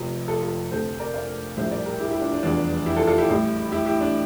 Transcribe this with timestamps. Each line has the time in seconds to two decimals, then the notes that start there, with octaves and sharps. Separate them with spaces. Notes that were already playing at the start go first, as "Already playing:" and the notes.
Already playing: F1 F2 C3
0.28 F4 A4
0.42 F4 A4
0.71 D2 C3 F3 A4 C5
0.99 A#4 D5
1.14 D5 F5
1.57 A#1 A2 G3 C5 E5
1.71 A#4 D5
1.86 G4 A#4
2.00 E4 G4
2.11 E4 G4
2.21 D4 F4
2.32 D4
2.43 F1 E2 E3 G3 D4 F4
2.86 E4 G4
2.97 F4 A4
3.07 F4 A4
3.18 E4 G4
3.29 A1 A2 G3
3.72 E4 G4
3.86 E4 G4
4.01 D4